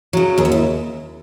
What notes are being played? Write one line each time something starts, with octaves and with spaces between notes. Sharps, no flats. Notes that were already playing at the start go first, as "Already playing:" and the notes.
C#3 F#3
D#2 G#4
F#4
E4